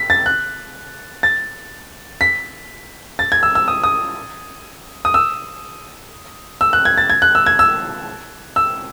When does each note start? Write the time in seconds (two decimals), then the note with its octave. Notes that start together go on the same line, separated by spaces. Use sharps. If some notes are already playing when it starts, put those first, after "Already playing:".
Already playing: B6
0.10 A6
0.26 F#6
1.23 A6
2.21 B6
3.19 A6
3.32 G#6
3.43 E6
3.55 E6
3.68 D#6
3.83 D#6
5.05 D#6
5.14 E6
6.61 E6
6.73 F#6
6.85 G#6
6.98 A6
7.10 G#6
7.22 F#6
7.35 E6
7.46 G#6
7.59 E6
8.56 E6